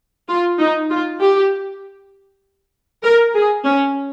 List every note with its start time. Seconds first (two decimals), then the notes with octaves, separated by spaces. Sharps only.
0.28 F4
0.59 D#4
0.90 F4
1.20 G4
3.03 A#4
3.34 G#4
3.65 C#4